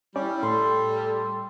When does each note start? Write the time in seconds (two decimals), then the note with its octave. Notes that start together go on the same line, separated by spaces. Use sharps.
0.16 G3 C#4 E4 D5
0.43 A2 A4 C6